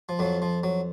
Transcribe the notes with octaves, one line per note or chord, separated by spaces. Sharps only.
F3
F2 F3 F#3
F3
F#3